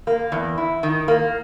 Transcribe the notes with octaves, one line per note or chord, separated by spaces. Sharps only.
A#3
E2
E4
D#3
A#3